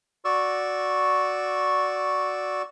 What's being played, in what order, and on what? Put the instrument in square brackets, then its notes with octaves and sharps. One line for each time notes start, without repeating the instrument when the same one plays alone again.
[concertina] F#4 D5 C#6 E6